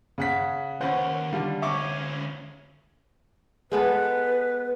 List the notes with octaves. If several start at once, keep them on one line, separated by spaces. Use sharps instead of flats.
C#3 F#5 B6
D#2 C#4 B4 C5 F#5
D3 G3 F4
D2 C#4 E5 C#6 D6
G#3 B3 A4 B4